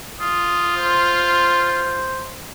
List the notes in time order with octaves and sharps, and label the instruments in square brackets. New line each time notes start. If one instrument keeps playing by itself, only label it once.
[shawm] F4 [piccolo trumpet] D#6
[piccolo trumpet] C5